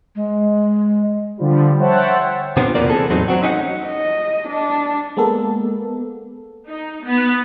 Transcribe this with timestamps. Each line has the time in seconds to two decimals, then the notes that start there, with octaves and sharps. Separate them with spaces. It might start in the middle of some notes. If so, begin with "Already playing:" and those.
0.16 G#3
1.37 D3 F3 G3
1.79 C5 C#5 E5 F#5 G5 A5
2.57 C3 B3 C4 D4 D#4 F4
2.75 E2 B2 F3 A#3 D5
2.90 E3 C4 G#4 A4
3.09 E2 A2 F#3 C4 C#4 D#4
3.28 F#3 C4 F#4
3.42 C#4 D#4 G4 F#5
3.87 D#5
4.49 D4
5.17 G#3 A#3 B3 A4
6.67 D#4
7.05 B3